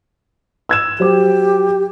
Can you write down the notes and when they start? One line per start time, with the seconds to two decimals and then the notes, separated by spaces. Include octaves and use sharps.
0.69 E6 G#6 E7
1.00 F#3 G4 C5 D6